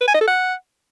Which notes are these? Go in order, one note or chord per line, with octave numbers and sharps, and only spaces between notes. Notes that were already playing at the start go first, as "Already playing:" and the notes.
B4
G#5
D#5
A4
F#5